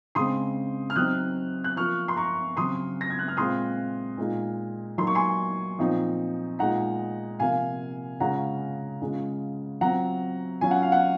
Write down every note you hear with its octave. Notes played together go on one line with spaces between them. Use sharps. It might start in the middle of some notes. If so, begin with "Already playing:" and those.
C#3 G#3 C4 C6 D#6
F6
F#3 C4 D#4 D#6 F#6
F#6
F3 A#3 F4 C#6 F6
C6
A#5 C#6
C#3 F#3 C4 C6 D#6
A#6
G#6
F#6
F6
A#2 G#3 C4 F4 C6 D#6
A#2 G#3 D#4
F#3 A#3 D#4 C6
C#6
G#5 C6
A#2 F3 C4 D#4
A#2 G#3 D#4 F#5 A#5
C3 F3 A#3 F4 F5 G#5
C#3 G#3 C#4 F4 F#5 A#5
C#3 G#3 C#4 F4
F#3 C4 F4 F#5 A#5
F#3 C#4 F4 G#5
F#5
F5
F#5